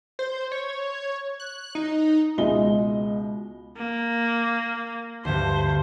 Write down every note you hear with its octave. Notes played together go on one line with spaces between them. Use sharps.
C5
C#5
F#6
D#4
C#2 B2 G#3 D#5 E5 G7
A#3
D2 G2 C5